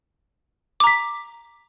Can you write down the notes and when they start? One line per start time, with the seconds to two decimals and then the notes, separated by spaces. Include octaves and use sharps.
0.80 D6
0.84 A#5
0.87 B6